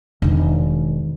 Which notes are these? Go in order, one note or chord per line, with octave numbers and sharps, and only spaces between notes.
E1 D#3